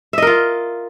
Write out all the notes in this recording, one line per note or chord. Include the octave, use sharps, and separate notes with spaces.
F4 A#4 D#5 E5